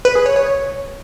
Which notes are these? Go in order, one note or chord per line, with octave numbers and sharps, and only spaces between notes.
B4
G#4
C#5
C#5
C#5